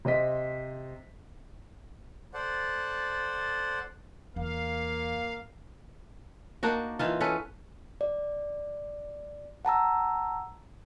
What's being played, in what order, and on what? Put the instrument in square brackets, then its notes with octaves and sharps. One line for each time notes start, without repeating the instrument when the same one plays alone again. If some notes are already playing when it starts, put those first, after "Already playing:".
[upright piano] C3 C5 D#5 B6
[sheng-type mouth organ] A4 C5 D5 F#5
[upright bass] E2 [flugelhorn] A#3 [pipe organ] F5
[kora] A#3 D4 D#4 F#4
E3 D#4 F4
C#4 A4 B4
[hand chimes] D5
F#5 A5 A#5 E6